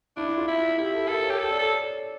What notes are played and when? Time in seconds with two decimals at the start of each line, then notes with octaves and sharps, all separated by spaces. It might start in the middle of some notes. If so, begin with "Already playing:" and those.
0.17 D4 E4
0.29 E4
0.38 F4
0.48 E4
0.58 F4
0.78 E4 G4
0.94 A4
1.08 A4 A#4
1.24 C#5
1.31 G4
1.39 A4
1.50 D5
1.59 A4 C#5